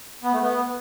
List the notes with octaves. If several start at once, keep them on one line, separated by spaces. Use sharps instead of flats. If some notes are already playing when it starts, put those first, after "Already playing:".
B3
A3
B3